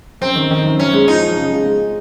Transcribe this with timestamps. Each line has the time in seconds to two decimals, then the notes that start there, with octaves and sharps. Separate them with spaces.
0.21 F#2 C4
0.35 D#3
0.51 D#3
0.65 F#2
0.79 F#2 C#4
0.93 G#3
1.08 F3 D#4
1.22 F3
1.36 C#3
1.51 G#3
1.66 G#3